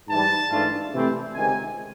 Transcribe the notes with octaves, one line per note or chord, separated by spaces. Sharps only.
G#2 E3 G3 A5
G#2 E3 A3 D4 F4
C3 E3 A3 C4
C#2 C3 D#3 G#3 G#5